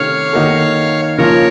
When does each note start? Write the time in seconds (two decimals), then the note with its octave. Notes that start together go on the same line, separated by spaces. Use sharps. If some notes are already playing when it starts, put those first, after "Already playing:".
Already playing: C3 D#3 A3 C#4 C#5 F5
0.33 D#3 A#3 D#4 F#4 A4
1.18 C#3 F3 A#3 F4 A#4 C#5